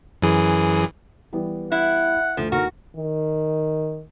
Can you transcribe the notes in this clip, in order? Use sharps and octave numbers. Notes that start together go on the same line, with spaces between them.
F#2 E3 G#4
E3 G3 B3
E4 F#5
D2 F3
D#2 A2 F#4 A#4
D#3